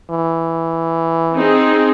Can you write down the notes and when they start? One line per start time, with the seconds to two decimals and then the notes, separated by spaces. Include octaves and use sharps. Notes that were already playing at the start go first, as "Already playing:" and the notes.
0.10 E3
1.36 C4 D#4 G#4